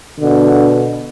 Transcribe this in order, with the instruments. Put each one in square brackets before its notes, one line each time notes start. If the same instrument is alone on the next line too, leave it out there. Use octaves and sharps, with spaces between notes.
[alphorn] B2 [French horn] D3